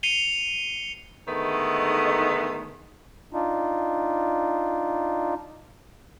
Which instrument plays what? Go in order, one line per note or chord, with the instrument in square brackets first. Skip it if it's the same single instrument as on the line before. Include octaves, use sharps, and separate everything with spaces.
[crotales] C7 C#7 D#7 F7 G7
[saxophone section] D3 D#3 G#3 A3 B3 D#4
[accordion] D4 D#4 F4